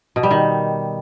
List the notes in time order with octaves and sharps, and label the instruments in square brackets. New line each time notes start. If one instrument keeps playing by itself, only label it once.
[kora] B2
G3
D#3